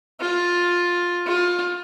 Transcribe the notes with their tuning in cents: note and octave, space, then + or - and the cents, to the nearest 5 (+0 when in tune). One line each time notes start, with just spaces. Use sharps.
F4 +10
F4 +20